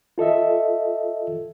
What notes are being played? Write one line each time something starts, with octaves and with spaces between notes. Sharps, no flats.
F4 A4 D#5 E5